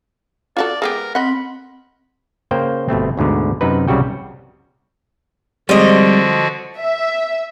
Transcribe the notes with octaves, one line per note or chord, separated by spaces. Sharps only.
F4 F#4 A4 D5
G#3 B3 G4 A#4
C4 D#5 F#5 B5
C#3 A#3 C5 G5
G1 B2 A3 C4
D2 G#2 B2 D3
F#2 C3 D#4 B4
C2 C#3 G3 F#4 G5
D3 F3 G3 G#3 C4 F#4 G4 D#5
E5